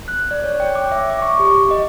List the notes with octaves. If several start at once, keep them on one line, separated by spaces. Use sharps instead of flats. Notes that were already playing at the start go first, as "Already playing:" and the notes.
F#6
D5
C#5
G5
D6
E5
D6
C#6
G4
D#5